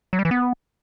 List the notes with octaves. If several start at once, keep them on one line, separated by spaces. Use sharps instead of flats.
F#3
G3
E3
B3